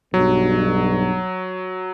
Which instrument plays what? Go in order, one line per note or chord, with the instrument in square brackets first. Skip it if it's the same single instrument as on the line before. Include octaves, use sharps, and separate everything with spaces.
[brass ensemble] B1 G2 [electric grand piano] F#3